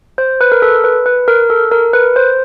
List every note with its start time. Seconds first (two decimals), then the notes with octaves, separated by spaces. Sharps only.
0.18 C5
0.41 B4
0.52 A#4
0.62 A4
0.84 B4
1.06 B4
1.28 A#4
1.50 A4
1.71 A#4
1.93 B4
2.16 C5